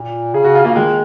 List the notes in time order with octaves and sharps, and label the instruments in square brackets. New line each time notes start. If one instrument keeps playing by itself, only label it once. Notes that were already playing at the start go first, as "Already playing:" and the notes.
Already playing: [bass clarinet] A#2
[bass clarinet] C#3 [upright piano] G#4
[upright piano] F#4
F4
[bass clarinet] C#3 [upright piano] A#3
[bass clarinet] D#3 [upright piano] G#3